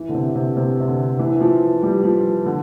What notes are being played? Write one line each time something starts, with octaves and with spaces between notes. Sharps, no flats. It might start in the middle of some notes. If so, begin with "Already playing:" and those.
Already playing: E3
D3
C3
C3
C3
C3
D3
E3
F3
G3
F3
D3